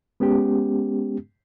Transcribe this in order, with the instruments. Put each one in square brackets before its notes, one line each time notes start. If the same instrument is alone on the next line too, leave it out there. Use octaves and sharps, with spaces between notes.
[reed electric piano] G#3 B3 C#4 G4